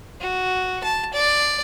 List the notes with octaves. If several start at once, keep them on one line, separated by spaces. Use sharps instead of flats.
F#4
A5
D5